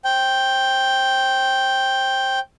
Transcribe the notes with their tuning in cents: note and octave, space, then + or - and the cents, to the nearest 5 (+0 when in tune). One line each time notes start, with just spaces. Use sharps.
C5 +35 G5 +0